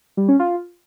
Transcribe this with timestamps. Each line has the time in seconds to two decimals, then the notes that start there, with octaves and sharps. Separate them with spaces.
0.17 G3
0.28 C#4
0.39 F4